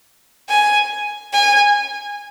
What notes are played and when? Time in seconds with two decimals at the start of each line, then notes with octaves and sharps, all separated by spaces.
0.49 G#5
1.33 G#5